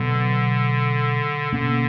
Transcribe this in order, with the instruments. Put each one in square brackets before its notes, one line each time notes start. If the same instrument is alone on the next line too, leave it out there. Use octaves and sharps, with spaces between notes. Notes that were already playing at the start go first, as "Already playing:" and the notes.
Already playing: [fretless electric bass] B2 F#3 B3 [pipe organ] D3
[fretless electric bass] B2 A#3 C#4 [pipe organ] D3